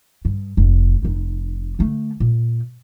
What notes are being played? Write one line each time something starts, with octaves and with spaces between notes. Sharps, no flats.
G2
F1
F1 D#4
D3 A3
A#2